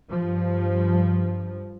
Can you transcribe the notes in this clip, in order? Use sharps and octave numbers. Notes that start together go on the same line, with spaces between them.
G2 F3